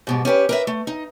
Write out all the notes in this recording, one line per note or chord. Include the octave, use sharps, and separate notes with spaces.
G#2 B2 G3
C#4 G4 A4 B4
A#4 B4 E5
A3
D#4